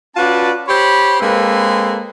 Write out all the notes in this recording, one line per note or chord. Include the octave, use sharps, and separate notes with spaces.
C#4 F4 F#4 B4 D5 A5
G4 C5 C#5 B5
G#3 A#3 C4 A4 B4